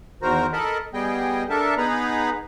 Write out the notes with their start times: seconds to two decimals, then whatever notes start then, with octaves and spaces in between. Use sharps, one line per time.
0.22 E2 D#3 F#4 A#4 C5 A#5
0.53 A4 A#4 D#5 A5 B5
0.94 G3 B3 G#4 D#5 G5
1.50 D4 A4 A#4 E5 A5
1.77 B3 D#4 G#4 B4 A#5 B5